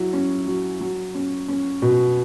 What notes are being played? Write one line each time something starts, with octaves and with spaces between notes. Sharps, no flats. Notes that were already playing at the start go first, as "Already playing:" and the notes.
Already playing: F#3 E4
C#4
F#3
F#3
C#4
C#4
B2